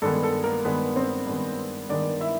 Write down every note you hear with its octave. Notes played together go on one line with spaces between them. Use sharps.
G2 D#3 G#3 B3 A4
A4
A#3 A#4
G2 D#3 G#3 B3 B4
C4 C5
G2 D#3 G#3 B3
G2 D#3 G#3 B3 D4 D5
E4 E5